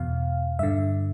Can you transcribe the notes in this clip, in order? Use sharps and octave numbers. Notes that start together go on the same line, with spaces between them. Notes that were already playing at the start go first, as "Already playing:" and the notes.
Already playing: E2 B2 F5
G2 D3 E5